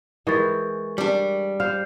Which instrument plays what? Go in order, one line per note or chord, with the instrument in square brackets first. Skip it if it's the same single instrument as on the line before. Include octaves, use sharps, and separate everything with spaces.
[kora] E3 G#3 G4 [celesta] A#4 C#6 A6
[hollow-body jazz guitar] G3 D4
[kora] C5 F5 [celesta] F6